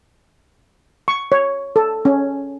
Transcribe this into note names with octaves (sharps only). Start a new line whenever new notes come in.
C#6
C#5
A4
C#4